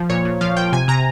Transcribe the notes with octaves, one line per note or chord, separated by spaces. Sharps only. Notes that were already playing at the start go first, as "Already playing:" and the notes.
Already playing: F3
A#2 C#5
A#2
F3 F5
F3 G5
C3 G#5
C3 A#5